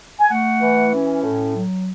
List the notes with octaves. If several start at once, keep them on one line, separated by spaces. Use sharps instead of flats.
G#5
A3 F#5
E3
C#4
A2
F#3